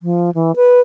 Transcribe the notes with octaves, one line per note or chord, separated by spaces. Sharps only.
F3
E3
B4